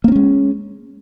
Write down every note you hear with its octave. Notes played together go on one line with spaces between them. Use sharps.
G#3 A#3 C4 C#4